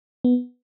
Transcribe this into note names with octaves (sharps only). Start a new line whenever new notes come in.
B3